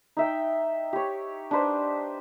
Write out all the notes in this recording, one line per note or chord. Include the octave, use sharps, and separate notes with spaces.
D#4 E5 G5
G4 C#5
D4 D#4 B4 C5